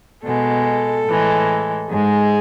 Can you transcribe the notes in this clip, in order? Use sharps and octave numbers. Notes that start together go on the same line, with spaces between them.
B2 G#3 A4
A2 E3 G#3
G#2 G#3 G#4